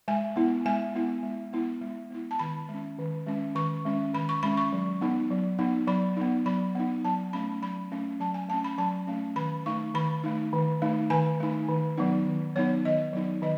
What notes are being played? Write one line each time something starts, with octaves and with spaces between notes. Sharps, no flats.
G#3 G#5
B3 E4
G#3 G#5
B3 E4
G#3
B3 E4
G#3
B3 E4
A5
D#3 B5
G#3 C#4
D#3
G#3 C#4
D#3 C#6
G#3 C#4
D#3 B5
C#6
G#3 C#4 B5
C#6
F#3
B3 D#4
F#3
B3 D#4
F#3 B5
B3 D#4
F#3 B5
B3 D#4
F#3 A5
A3 C#4 B5
F#3 B5
A3 C#4
F#3 A5
G#5
A3 C#4 A5
B5
F#3 A5
A3 C#4
D#3 B5
A3 D#4 C#6
D#3 B5
A3 D#4
D#3
A3 D#4
D#3 G#5
A3 D#4
D#3
F#3 B3 D#4
D#3
F#3 B3 D#4 C#5
D#3 D#5
F#3 B3 D#4
D#3 D#5